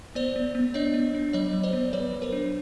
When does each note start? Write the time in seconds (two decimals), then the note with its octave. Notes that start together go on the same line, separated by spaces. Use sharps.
0.15 B3 C5 D5
0.36 B3
0.55 B3
0.74 D4 C#5 D#5
0.94 B3
1.15 D4
1.33 F#3 C#5 D#5
1.53 F#3
1.63 C5 D5
1.73 B3
1.93 F#3 B4 C#5
2.13 F#3
2.22 A#4 C5
2.32 D4